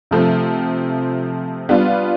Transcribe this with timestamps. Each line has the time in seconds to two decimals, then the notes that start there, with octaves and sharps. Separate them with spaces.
0.11 C3 F3 A3 C4
1.69 G3 B3 D4 F4